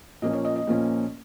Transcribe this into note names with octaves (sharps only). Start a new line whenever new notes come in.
A#2 F3 A#3 C#4 D#5
C#5
D#5
D#5
A#2 F3 A#3 C#4